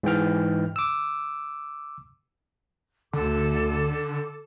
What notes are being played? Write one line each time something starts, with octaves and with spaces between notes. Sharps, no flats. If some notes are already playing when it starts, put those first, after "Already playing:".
G#2 E3 G5 F6
D6 E6
D2 D3 A4 D6